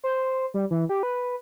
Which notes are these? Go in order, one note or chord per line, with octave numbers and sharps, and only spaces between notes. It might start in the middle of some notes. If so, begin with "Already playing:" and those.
C5
G3
E3
G4
B4